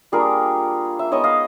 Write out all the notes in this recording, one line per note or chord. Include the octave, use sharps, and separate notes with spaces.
G3 A#3 D4 F4 G#4 A#4
E5
G#3 B3 D#4 C#5 D#5
D#5 F5